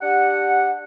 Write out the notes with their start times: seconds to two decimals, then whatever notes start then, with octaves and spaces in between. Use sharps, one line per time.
0.01 D4 G4 F#5